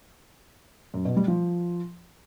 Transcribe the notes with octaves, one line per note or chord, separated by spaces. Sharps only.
F#2
B2
G3
F3